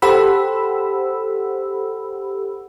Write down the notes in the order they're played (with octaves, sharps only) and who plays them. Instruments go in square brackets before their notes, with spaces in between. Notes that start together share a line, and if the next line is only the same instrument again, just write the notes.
[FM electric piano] G4 A4 C5 F#5 B5 E6